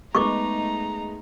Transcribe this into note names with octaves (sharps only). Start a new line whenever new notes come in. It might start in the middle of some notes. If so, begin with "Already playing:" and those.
G#3 A3 B3 D#4 A#5 C#6 D6